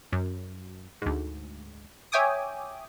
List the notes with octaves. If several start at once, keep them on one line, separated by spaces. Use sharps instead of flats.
F#2
D2 G#2
C#5 E5 G5 G#5 D6 D#6